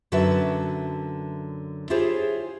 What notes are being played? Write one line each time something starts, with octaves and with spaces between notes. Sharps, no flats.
F#2 D3 F#4 B4 E5 A5
E4 F4 G4 G#4 C5 C#5